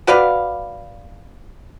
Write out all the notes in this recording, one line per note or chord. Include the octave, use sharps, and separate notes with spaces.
F#4 B4 D5 F5